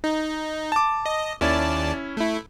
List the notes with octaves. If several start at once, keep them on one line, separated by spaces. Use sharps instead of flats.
D#4
A5 D6
D#5
D#2 C#4 E4 D5 A5
A3 E4